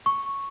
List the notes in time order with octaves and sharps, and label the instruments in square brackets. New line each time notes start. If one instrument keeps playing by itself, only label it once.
[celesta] C#6